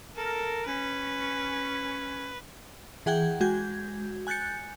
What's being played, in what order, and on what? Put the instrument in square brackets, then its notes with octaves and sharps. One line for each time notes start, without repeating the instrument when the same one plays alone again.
[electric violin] A4 [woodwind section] A#4
[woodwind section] C#4 [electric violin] B4
[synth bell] E3 G#4 F#5 G5 G6 G#6
G#3 F#4 G6 G#6
G#5 F#6 G6 A6 C#7